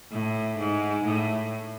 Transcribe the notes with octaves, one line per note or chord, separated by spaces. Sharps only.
A2
G#2
A2